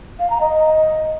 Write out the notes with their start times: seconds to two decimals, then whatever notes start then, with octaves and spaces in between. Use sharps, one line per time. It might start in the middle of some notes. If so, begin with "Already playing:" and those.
0.19 F5
0.30 A#5
0.41 D#5